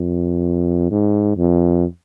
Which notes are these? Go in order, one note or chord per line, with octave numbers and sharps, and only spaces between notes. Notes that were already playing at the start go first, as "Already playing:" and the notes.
Already playing: F2
G#2
F2